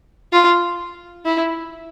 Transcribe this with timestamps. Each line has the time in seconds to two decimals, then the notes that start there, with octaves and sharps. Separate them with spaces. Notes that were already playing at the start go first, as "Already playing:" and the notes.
0.33 F4
1.25 E4